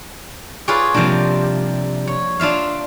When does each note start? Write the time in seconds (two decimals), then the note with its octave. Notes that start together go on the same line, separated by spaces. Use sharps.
0.68 F4 G#4 B4 C#5 D5
0.94 C3 F3 G3 A#3 D4
2.07 C#5
2.40 D4 F4 E5 F5